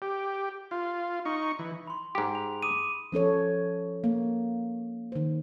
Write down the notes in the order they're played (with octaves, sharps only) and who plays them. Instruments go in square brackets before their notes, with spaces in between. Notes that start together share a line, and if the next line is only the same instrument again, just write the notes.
[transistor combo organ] G4
F4
D#4 C#6
E3
[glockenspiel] B5 C6
[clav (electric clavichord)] G#2 G4
[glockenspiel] F7
D6 D#6 D#7
[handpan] F3 C#4 A4 C#5
A#3
D#3 C5